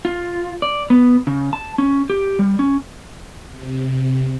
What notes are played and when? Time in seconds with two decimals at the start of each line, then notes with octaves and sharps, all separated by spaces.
0.05 F4
0.62 D5
0.90 B3
1.27 C#3
1.53 A5
1.78 C#4
2.10 G4
2.39 G3
2.59 C#4
3.50 C3